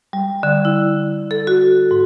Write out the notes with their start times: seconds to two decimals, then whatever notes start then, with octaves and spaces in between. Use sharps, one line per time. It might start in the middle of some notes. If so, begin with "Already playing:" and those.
0.13 G3
0.43 D3
0.65 E4
1.31 A4
1.47 F#4
1.91 G#2